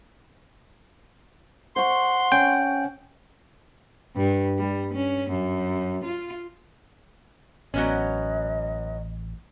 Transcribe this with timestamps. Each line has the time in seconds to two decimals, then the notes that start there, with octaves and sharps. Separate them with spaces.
1.76 C5 F#5 C6 C#6
2.32 C#4 G5
4.16 G2
4.57 G3
4.94 C#4
5.31 F#2
6.05 F4
7.74 A1 F#3 B3 C#4 D#5